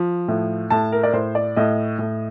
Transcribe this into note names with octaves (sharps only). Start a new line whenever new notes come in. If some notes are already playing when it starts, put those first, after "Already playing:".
Already playing: F3
A2
A2 A5
A#4
D5
A2 C5
D5
A2 D#5
A2